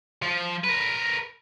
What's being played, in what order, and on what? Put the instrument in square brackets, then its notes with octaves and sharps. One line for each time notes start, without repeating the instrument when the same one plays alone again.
[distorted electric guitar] F3
A#4 B4